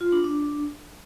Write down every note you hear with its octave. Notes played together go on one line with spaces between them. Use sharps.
F4
D4
D4